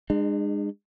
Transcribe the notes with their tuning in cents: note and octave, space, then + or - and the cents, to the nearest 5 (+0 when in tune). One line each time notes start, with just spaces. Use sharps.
G#3 -25 D4 +45